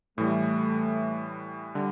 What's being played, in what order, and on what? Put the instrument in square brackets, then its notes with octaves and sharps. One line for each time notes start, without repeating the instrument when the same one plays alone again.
[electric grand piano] A2 E3 G3 [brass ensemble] A3
[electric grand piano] D3 G3